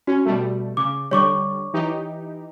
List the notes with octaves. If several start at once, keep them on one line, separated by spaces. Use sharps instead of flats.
C#4 F#4
B2 G3 A3
C#3 D6
D3 G3 C#5 C#6 D6
E3 D#4 G4